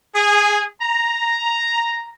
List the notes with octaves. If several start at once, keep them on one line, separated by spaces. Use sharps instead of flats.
G#4
A#5